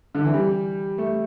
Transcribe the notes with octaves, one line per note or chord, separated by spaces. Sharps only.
D3
E3
G3
A3